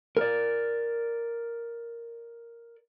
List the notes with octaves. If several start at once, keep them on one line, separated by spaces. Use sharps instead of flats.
A#4 D5